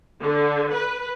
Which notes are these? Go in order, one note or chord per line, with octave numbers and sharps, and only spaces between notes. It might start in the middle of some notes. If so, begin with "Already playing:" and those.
D3
B4